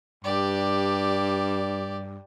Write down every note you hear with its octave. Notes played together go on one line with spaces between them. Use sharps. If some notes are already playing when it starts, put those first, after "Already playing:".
G2 G4 D5